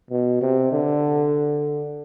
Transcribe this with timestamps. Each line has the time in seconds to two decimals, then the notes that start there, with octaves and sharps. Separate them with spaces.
0.11 B2
0.41 C3
0.72 D3